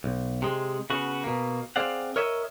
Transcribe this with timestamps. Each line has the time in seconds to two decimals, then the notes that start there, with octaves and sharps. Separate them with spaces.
0.04 B1
0.42 C3 G#3
0.90 C#3 B3 F#4
1.24 B2 A#3
1.76 C4 G#4 D5 F5 F#5
2.16 A#4 C#5 D#5 E5